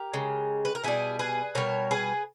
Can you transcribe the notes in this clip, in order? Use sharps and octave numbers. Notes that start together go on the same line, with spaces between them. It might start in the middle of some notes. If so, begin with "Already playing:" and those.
Already playing: G4 A#4
C#3 G#3
B4
A#4
B2 G3 E4 G#4
G#4 B4
B2 G3 A#4 C#5
G#4 B4